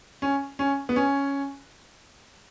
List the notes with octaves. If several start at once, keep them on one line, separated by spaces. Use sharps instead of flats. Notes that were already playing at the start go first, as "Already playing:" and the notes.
C#4
C#4
B3
C#4